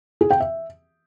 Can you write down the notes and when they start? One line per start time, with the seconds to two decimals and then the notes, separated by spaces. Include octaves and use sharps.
0.21 G#4
0.31 G5
0.40 E5